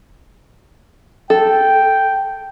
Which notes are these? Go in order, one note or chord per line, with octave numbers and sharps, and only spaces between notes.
A4 G5